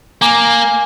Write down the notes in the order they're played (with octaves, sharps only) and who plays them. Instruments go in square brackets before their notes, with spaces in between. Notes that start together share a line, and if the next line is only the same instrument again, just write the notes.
[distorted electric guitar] A#3 [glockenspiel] G#5 A#5 D6